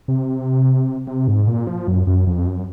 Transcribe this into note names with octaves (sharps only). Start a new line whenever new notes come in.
C3
C3
G#2
A#2
F3
F#2
F#2
F2
F#2